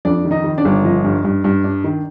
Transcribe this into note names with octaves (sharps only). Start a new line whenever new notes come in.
F2 D4 D5
D#3
D#4 D#5
D#3
D4 D5
G1
F3 D#4 D#5
G2
G2
G2
D4
D#3